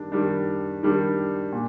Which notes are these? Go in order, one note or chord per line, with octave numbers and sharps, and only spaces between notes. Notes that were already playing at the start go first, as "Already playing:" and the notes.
Already playing: D#3 G3 D4
D#3 G3 D4
D#3 G3 D4
A#2